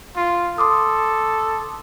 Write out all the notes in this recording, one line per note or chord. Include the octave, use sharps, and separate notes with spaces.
F4
A4 C6 D6 D#6